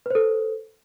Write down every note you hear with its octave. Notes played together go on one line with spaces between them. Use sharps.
A4 B4 C5